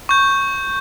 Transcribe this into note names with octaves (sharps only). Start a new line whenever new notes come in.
C#6 G6